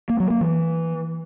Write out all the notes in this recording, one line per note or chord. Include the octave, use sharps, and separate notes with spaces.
A#3
F#3
A#3
E3